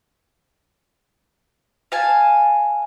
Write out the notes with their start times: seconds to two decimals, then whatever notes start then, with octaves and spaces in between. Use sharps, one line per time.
1.92 F5 G#5 A5